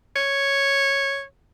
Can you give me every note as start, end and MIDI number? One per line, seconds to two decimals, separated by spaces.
0.16 1.23 73